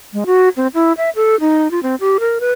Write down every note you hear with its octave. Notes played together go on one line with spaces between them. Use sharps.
G#3
F#4
C4
E4
E5
A4
D#4
F4
C4
G4
A#4
B4